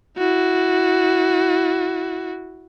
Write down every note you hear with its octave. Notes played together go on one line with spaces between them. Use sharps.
E4 F#4